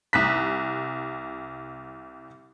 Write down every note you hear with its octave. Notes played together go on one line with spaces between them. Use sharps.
C2 F#6 B6